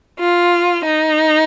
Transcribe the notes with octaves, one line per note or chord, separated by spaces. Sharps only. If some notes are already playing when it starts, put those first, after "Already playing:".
F4
D#4